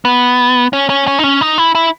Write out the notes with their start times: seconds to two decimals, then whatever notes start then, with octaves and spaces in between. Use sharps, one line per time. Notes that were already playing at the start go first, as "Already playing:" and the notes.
0.05 B3
0.73 C#4
0.89 C#4
1.08 C#4
1.19 D#4
1.24 C#4
1.41 D#4
1.58 E4
1.75 E4